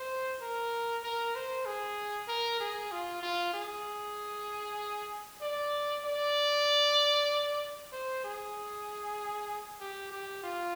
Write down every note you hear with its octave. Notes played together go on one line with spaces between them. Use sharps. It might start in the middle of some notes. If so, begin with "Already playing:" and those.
Already playing: C5
A#4
A#4
C5
G#4
A#4
G#4
F4
F4
G#4
D5
D5
C5
G#4
G4
G4
F4